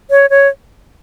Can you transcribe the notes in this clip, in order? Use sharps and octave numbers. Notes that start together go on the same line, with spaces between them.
C#5
C#5